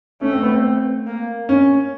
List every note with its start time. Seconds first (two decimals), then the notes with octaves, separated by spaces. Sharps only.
0.21 A3 C#4
0.33 C4
0.43 B3
0.53 C4
1.07 A#3
1.49 C#4